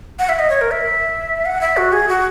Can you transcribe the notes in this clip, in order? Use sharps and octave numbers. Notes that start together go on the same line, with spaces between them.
F#5
E5
D#5
C#5
A#4
E5
F#5
E5
F#4
G#4
F#4